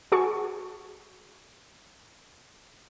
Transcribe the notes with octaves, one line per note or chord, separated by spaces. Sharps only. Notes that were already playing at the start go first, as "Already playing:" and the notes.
F#4 G#4 A5 C#6